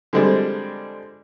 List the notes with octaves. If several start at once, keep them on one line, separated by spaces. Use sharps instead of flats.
D3 F3 G3 G#3 C4 D4